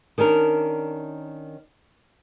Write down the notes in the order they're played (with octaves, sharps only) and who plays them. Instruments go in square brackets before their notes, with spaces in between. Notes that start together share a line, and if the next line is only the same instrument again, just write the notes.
[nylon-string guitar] D#3 C#4 D4 A#4